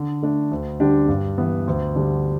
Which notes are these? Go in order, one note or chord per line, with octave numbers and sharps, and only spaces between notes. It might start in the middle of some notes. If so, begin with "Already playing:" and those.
Already playing: D3
A3 D4
D2
D3 G3 D4 G4
G2
E3 B3
D2
D3 G3 D4